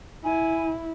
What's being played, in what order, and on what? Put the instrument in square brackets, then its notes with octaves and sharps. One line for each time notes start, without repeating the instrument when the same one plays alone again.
[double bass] E4 [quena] G#5